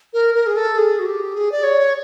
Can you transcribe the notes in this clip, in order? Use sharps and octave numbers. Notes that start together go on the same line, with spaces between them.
A#4
A#4
G#4
A4
G#4
F#4
G4
G#4
D5
C#5